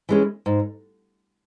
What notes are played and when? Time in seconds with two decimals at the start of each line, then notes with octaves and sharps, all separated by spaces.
0.09 E3 G#3 C#4
0.46 G#2